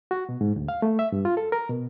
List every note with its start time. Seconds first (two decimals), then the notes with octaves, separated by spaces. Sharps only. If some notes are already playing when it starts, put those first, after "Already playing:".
0.11 F#4
0.29 B2
0.41 G#2
0.56 D2
0.68 F5
0.82 A3
0.99 E5
1.12 G2
1.25 F4
1.37 A4
1.52 A#4
1.69 B2